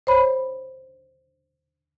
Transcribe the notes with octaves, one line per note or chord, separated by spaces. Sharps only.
C5 C#5 B5